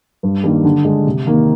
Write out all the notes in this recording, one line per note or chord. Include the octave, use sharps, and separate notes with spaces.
G2
D#3 G3 A#3 D4
D3
G#3 D4
C3
D#3 A#3